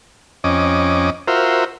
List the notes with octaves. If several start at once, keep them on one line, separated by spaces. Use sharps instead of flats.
F2 C#4 D#5 D6
F4 F#4 A#4 C5 E5